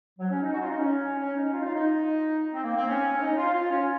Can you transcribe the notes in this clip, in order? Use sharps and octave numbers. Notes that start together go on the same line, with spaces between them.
F#3
C#4
D#4
F#4
F4
D#4
C#4
C#4
D#4
F4
D#4
F4
D#4
C4
A#3
C4
C#4
C#4
D#4
F4
F4
C#4